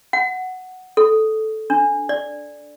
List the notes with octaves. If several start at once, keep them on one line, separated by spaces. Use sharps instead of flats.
F#5
A4
D4
D5